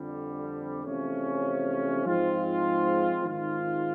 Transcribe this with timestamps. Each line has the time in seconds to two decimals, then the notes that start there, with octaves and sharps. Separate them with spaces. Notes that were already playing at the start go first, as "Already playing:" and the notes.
Already playing: F2 D3 G3
0.85 E2 C3 F3 A3 C#4
2.04 G#2 F3 G#3 C4 F4
3.24 G#2 D#3 G#3 C4 F4